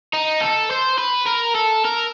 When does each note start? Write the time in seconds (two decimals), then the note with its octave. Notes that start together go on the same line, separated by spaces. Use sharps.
0.13 D#4
0.41 A4
0.70 C5
0.98 B4
1.27 A#4
1.55 A4
1.85 A#4